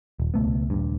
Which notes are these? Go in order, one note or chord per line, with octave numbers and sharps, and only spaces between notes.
D#1
C#2 B2 A3 B3
D#1 G2